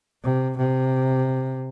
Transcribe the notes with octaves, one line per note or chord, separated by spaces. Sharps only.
C3
C3